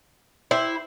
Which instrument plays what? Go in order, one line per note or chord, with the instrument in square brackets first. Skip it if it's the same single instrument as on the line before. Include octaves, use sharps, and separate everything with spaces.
[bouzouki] E4 [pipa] G4 C5